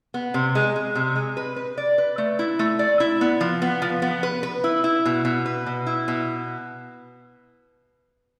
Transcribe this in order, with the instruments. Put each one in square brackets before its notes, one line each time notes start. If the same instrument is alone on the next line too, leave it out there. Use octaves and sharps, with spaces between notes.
[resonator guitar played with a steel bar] B3
C3
G#3
G#3
C3
G#3
B4
B4
D5
B4
A3
E4
A3
D5
E4
B3
F3
B3
F3
B3
B4
B4
E4
E4
B2
B2
B4
B2
E4
B2